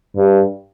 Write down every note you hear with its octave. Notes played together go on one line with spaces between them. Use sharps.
G2